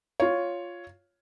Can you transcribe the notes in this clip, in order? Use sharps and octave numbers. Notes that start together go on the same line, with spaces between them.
F4 C#5